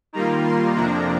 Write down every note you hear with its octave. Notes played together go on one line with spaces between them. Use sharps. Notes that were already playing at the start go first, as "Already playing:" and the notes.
D#3 G3 A#3 F4 A#5
C6
F2 C3 F3 A#3 D4 A#5